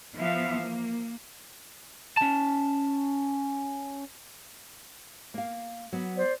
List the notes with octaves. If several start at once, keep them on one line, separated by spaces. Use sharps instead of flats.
E3 F3 B3 E5 F5
A#3
C#4 A5
A#3 F5
F#3 B3
C5 D5